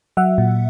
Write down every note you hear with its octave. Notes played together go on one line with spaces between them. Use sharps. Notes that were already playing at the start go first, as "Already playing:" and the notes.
F#3 E5 F#5
A#2